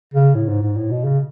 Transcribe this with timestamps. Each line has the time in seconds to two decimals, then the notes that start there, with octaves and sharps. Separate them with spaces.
0.14 C#3
0.35 A2
0.48 G#2
0.62 G#2
0.76 A2
0.91 B2
1.04 C#3